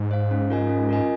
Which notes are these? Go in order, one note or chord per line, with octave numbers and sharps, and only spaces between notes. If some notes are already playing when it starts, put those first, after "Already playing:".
Already playing: G#2
C5 F5
C#4
F4 A#4 D#5 G#5
C#4
F4 A#4 D#5 G#5